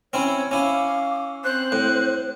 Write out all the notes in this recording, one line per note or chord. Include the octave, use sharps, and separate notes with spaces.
C4 C#4 E4 C#5
C#4 E4 F5 D6
C4 C5 F#6
A2